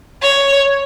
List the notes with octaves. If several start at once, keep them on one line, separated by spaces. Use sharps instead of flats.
C#5